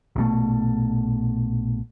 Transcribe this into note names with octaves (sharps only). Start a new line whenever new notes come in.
A#1 B2 A3